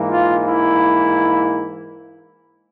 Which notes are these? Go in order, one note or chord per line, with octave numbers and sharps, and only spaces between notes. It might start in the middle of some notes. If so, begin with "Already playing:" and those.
Already playing: G#2 E3 A#3
F4
E4